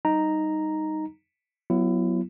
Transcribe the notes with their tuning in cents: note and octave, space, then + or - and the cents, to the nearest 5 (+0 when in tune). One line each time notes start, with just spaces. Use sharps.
G3 +0 D#4 +0 A#5 +0
F#3 +0 B3 +0 E4 +30